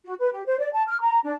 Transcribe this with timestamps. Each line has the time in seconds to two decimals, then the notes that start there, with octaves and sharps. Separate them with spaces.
0.05 F#4
0.19 B4
0.33 G4
0.46 C5
0.59 D5
0.72 A5
0.88 F6
1.01 A#5
1.25 D4